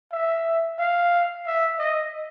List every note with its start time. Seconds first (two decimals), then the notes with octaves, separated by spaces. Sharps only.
0.12 E5
0.79 F5
1.46 E5
1.79 D#5